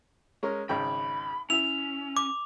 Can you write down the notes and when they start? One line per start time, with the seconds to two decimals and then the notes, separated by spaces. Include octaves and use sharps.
0.43 G#3 C#4 A#4
0.69 G#1 C#3 G5 B5
1.50 C#4 E4 E5 F7
2.17 D6